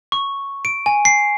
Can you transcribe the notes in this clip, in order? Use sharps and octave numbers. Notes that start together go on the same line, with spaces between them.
C#6
D7
G#5
C7